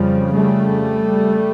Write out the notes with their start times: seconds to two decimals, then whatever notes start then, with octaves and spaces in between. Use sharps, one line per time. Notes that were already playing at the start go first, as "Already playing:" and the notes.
Already playing: F2 C#3 F3 G3
0.34 G3 A3